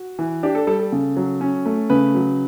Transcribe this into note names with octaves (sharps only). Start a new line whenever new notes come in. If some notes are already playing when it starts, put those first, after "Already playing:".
Already playing: F#4
E3
D4 G4
A4
G3 A4
A4
C#3
F#3
C#4
A3
C#3 B4
F#3